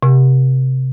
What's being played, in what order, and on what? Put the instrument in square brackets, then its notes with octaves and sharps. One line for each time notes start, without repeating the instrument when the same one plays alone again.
[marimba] C3